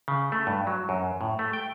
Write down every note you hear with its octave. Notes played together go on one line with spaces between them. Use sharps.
C#3
A3
G2
F#3
F#2
A2
A3
G5